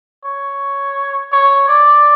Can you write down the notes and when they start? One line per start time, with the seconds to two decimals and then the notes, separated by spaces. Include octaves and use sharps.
0.24 C#5
1.32 C#5
1.68 D5